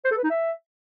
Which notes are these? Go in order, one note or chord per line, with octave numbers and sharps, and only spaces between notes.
C5
A4
B4
D#4
E5